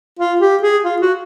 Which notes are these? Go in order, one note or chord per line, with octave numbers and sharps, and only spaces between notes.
F4
G4
G#4
F4
F#4